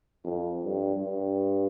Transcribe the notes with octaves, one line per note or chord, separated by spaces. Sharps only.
F2
G2
G2